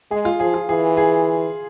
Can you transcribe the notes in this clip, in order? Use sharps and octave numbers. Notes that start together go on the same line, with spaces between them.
G#3 G#4
F4
F3 G#4
F4
E3 G#4
G#4